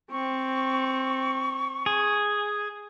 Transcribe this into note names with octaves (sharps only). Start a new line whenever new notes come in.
C4 C#6
G#4